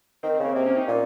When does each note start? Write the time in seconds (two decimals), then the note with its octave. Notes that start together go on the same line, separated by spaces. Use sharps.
0.23 D#3 C4
0.34 C4
0.40 C#3 A#3
0.55 C3 A#3
0.66 C#4
0.77 D#4
0.88 A#2